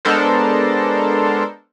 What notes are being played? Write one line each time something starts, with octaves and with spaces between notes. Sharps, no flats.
G#3 B3 D4 A4 A#4 C5